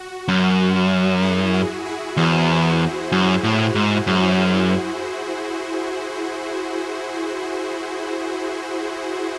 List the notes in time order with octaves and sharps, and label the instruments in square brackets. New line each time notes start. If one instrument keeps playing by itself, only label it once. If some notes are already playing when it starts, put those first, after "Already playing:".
Already playing: [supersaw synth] F#4
[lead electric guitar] F#2
[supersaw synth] E4 G#4
F#4
E4 G#4
[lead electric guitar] E2 [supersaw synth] G#4 C5
[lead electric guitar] F#2
A2
G#2
F#2